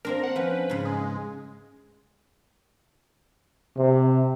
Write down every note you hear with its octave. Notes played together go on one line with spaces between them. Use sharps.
A#3 C4 D4 A#4
F#5
F3 C#4 B4
G#2 C#3
G#3
C3